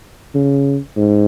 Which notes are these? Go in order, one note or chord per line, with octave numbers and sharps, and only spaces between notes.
C#3
G#2